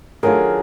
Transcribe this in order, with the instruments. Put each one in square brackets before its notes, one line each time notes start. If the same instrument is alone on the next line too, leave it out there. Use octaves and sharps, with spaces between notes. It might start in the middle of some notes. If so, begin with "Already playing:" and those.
[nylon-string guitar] D#3 F#3 A3 D4 F4 [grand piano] G#4 A#4